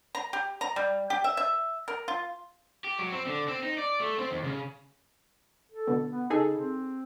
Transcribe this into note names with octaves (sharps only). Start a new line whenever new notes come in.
A#5
G4
A#5
G3
G4
E5
E5
A#4
F4
G4
F#3
C4
D3
C4
D#4
D5
A3
C4
D#2
C#3
A4
B2 D3
B3
C#3 D#4 G#4 A4
C4